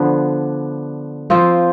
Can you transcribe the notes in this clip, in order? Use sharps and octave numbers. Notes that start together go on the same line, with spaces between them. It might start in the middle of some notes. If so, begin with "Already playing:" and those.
Already playing: D3 F3 B3
F3 C4 F4 C5